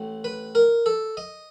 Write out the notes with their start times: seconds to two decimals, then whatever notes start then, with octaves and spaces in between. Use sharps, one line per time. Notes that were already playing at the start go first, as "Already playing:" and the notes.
Already playing: A1 A2
0.24 B4
0.55 A#4
0.86 A4
1.17 D#5